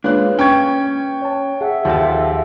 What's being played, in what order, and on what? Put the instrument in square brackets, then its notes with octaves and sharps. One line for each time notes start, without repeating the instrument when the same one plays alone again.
[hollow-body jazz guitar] G#3 D4 [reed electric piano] A#3 B4 C#5 [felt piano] F4 F#6
[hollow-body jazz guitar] C#4 [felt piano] G5 C#6 G#6
[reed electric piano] C#5 A5
[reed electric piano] G#4 F#5 [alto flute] E5
[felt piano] D#2 [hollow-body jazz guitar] F3 F#4 A4